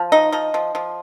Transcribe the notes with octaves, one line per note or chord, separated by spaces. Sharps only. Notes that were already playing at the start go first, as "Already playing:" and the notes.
Already playing: F3
D#4 D#5
F3 D#5
F3
F3